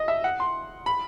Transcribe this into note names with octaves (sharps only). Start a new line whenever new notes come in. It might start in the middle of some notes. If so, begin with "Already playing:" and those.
Already playing: D#5
E5
F#5
C6
B5